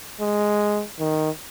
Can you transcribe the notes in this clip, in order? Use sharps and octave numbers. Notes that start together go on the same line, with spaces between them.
G#3
D#3